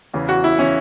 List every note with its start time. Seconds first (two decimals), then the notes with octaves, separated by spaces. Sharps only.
0.14 E2 C#3 E3
0.29 F#4
0.44 E4
0.59 C#3 E3 C#4